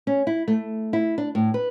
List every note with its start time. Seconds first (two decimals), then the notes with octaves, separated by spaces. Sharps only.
0.07 C#4
0.27 E4
0.48 A3
0.93 E4
1.18 D4
1.35 A2
1.54 B4